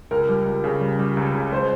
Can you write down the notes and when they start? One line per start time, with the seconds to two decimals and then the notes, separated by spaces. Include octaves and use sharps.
0.11 C#2 A#4
0.29 G3
0.46 C#2
0.64 C#3
0.81 G3
0.99 G3
1.17 C#2
1.35 C#3
1.52 G#3 C5